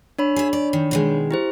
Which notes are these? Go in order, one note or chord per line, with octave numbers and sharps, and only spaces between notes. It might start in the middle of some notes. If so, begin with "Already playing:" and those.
D4 C#5 B5
G#4 E5
D5
D#3
B2 D#3 G#3
E4 G4 C5